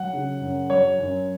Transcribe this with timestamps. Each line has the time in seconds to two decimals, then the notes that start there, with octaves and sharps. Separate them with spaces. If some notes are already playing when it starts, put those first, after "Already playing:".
Already playing: F#3 F#5
0.13 C#3
0.41 F#2
0.70 F#3 C#5
0.99 F#2